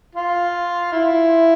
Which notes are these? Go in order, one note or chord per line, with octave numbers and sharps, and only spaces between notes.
F4
E4